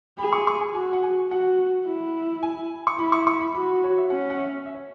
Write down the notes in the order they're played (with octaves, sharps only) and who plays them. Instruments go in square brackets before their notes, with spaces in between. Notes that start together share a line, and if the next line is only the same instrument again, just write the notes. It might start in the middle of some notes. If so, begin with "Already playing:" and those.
[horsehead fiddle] G#4 [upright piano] B5
[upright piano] C#6
C#6
G#5
[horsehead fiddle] F#4 [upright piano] G#5
[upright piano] F#5
G#5
[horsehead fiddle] F#4 [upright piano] F#5
[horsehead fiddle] E4
[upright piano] G#5
C#6
[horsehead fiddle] E4 [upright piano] B5
[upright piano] C#6
C#6
B5
[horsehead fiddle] F#4 [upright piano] B5
[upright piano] C#5
E5
[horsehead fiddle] C#4 [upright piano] F#5
[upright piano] F#5
E5
E5
C#5